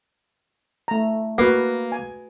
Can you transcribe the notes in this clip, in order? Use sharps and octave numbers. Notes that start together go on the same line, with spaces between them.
A3 A#5
A#3 F#4 B4
G#5